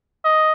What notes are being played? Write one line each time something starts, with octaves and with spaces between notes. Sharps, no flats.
D#5